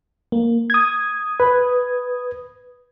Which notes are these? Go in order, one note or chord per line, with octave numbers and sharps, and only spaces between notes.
A#3
D#6 G#6
B4